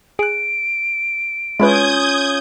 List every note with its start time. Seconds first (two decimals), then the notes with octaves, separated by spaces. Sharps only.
0.19 G#4 F#6 D7
1.60 G#3 C#4 E4 F4 B4 D#6 G6 G#6